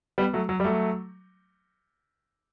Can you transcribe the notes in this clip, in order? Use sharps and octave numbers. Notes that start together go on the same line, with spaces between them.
G3 B3
F#3 A3
F#3
G3
F#3 A3